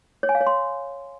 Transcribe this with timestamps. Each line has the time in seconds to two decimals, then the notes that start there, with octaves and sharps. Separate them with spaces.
0.23 C#5
0.29 G#5
0.35 F5
0.41 C#5
0.47 C6